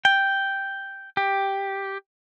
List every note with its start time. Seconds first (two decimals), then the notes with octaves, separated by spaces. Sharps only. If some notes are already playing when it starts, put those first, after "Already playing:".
0.05 G5
1.17 G4